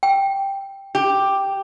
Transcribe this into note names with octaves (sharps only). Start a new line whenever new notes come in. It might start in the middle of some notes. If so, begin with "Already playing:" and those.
G5
G4